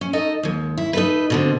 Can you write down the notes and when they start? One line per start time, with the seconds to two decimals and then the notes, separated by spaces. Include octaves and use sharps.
0.01 C#4
0.13 D#4 A4 D#5
0.43 D#2 G#2
0.77 E4
0.93 D#4 A4 B4
1.30 B2 D3 C4